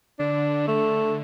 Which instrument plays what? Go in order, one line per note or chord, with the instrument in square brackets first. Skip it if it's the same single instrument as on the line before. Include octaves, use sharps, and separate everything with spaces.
[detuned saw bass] D3 [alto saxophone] D4
[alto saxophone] A3